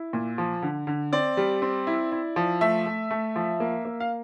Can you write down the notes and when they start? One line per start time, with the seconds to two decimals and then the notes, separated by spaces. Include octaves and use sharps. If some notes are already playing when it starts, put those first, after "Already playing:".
Already playing: E4
0.13 A#2
0.38 F3
0.62 D3
0.87 D3
1.12 C4 D5
1.37 G3
1.62 C4
1.87 E4
2.12 E4
2.36 F3
2.61 A3 E5
2.86 A3
3.11 A3
3.36 F3
3.60 A#3
3.85 A#3
4.00 F5